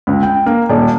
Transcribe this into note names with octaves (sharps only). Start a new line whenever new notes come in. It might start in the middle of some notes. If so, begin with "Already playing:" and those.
C#2
G5
A#3
D#1